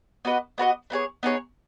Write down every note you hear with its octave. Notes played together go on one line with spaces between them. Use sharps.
B3 F#4 B4 D#5
B3 F#4 B4 D#5
B3 D#4 G#4 C#5
B3 D#4 G#4 C#5